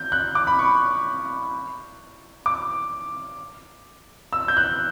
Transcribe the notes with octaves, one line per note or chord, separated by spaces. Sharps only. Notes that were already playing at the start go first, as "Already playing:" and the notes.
Already playing: G6
F#6
D6
B5
C#6
D6
E6
G6
F#6